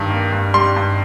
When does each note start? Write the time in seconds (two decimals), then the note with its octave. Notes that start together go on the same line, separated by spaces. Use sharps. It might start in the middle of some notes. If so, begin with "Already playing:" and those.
Already playing: G2 D#3
0.10 A#3
0.32 G2
0.54 G3 C6
0.76 G2